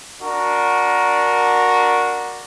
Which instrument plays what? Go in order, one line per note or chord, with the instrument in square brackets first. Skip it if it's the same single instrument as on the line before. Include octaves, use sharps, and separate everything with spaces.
[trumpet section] D4 F#4 A#4